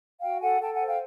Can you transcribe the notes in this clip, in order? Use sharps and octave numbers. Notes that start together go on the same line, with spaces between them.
F#4 F5 G5
A4 F#5 G#5
A4 G5 A5
F#5 G#5
C5
F5 G5